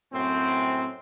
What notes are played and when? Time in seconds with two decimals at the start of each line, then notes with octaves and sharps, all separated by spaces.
0.13 F#2 A2 C4